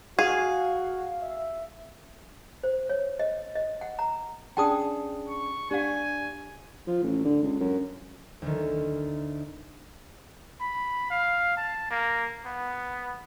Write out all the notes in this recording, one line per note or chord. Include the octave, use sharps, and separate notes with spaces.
F#4 G#4 F5
E5
C5
C#5
D#5
D#5
F#5
A#5
C#4 D4 G#4 G5 A5 D#6
C#6
D4 G4 F5 G#5
F3
A1
D3
C#2
F#2
D2 D#3
B5
F5
A5
A#3
B3